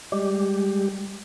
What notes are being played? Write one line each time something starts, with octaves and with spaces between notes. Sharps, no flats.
G3 G#3 G4